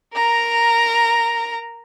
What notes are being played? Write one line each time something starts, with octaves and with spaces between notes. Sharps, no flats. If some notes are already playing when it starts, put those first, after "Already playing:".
A#4 A#5